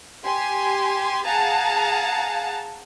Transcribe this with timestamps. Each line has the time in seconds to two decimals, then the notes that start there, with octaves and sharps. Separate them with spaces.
0.23 G4 G#5 C6
1.24 G#4 F5 F#5 A5 A#5